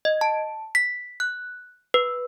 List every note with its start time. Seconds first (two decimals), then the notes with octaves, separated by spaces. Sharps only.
0.05 D#5
0.21 A5
0.75 B6
1.20 F#6
1.94 B4